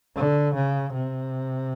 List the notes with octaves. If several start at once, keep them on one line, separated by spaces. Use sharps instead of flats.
D3
C#3
C3